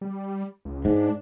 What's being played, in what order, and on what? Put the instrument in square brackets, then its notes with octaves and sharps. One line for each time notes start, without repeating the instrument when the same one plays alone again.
[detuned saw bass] G3
C#2
[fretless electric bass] G#2 [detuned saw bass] D4